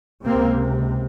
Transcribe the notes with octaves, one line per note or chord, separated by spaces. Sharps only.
C#2 C3 A#3 C4